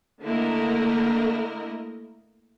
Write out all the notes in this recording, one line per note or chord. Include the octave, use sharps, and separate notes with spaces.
D3 A3 A#3 E4 A#4 D#5